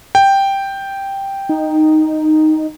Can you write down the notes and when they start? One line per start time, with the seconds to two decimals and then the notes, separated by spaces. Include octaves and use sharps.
0.15 G5
1.49 D#4